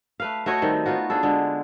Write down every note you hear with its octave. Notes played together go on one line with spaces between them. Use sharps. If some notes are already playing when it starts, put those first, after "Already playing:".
A3 B4 F5
A3 F#4 C#5 D#5
D#3 G3 C4
B3 D#4 F4 F#4
D4 F4 G#4 A4
D3 G#3